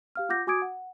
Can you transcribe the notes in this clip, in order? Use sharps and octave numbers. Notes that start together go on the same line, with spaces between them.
G4 F5 F6
F4 F#5 D6 G6 A#6
F#4 G#5 D6 D#6 G#6 D7
F#5